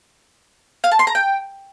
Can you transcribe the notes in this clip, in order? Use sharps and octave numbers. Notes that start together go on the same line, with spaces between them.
F5
A5
C6
A#5
G5